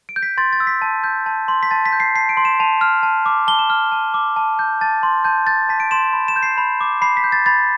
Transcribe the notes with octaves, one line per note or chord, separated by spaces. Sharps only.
D7
G6
B6
C6 A6
A6
E6
B6
A5
G6
A5
C6
B6
A5 A6
B6
G6
C7
A5 C7
D7
C6
E7
A5 F7
F6
A5
D6
A5 G7
E7
F6
A5
D6
A5
G6
A5 A6
C6
A5 G6
G6 A6
A5 B6
D7
C6 E7
B5
E7
G6
C7
B5
D6
B5 C7
B6
G6
A6
B5 A6